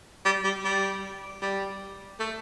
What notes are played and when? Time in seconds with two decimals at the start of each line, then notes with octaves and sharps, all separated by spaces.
0.25 G3
0.44 G3
0.64 G3
1.42 G3
2.19 A3